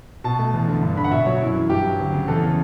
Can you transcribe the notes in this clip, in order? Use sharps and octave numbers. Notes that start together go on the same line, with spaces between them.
B2 A5
A3
E2
D3
G2
D3 B5
F#5
B2 E5
F#3 C#5
F#2 E4
E3
G2 G4
F#3
D2
C#3
E2 A4
C#3